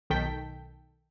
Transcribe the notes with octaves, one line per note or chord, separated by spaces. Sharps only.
B1 D#3 A4 G5 B6